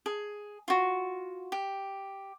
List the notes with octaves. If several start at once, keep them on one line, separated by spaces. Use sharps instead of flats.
G#4
F4 F#4
G4